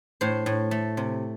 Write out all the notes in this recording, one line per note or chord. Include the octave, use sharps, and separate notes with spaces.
A2 C5
A2
A3
C3